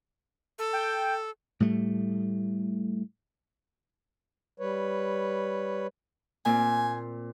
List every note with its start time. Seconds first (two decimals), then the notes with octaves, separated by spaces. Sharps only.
0.58 A4
0.73 G5
1.60 A2 G3 A3
4.59 G3 B4 C#5
6.46 A#2 C4 G#5